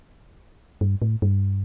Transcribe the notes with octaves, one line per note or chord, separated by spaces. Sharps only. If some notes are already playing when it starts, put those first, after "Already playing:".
G2
A2
G2